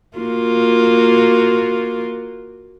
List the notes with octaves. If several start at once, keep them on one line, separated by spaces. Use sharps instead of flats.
A#3 F4 F#4